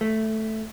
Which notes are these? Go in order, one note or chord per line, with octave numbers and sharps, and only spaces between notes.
A3